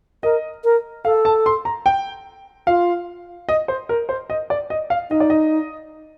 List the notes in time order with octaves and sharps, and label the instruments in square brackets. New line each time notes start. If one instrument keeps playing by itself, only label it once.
[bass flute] A#4 [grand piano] D#5
[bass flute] A#4
[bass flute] A4 [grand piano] F5
[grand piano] A5
C6
A#5
G5
[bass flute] F4 [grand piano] F5
[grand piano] D#5
C5
A#4
C5
D#5
D5
D#5
F5
[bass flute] D#4 [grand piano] D#5
[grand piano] D5
D#5